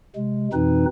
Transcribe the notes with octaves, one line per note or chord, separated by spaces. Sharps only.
C3 G#3
F2 B2 E3 C4 D#4 B4